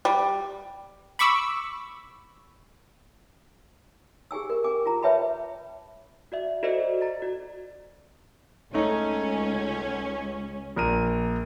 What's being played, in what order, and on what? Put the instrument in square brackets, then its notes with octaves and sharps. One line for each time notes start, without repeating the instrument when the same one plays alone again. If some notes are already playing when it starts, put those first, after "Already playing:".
[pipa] G3
[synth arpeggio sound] B5 C#6 D6 E6
[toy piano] G4 G#4 G#5 E6
A#4
C#4 G#5 D6
F4 A#5
B4 C#5 E5 G5 A5 B5
[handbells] F#4 D5 E5
F#4 A4 C5 D5 D#5
A#5 A6
F#4 D5
[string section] C#2 C#4 [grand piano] A3 D#4
[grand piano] A#1 A#4 D#7